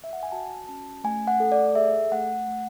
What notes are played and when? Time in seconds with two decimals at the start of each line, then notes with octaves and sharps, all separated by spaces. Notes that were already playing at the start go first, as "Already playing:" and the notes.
0.04 E5
0.13 F#5
0.23 G#5
0.32 F#4 A5
0.68 C#4 A5
1.04 A3 G#5
1.27 F#5
1.40 A4
1.52 D5
1.75 G#4 E5
2.12 A3 F#5
2.47 A3